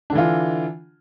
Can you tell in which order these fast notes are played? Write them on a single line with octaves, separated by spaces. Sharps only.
D4 D3 E3 F4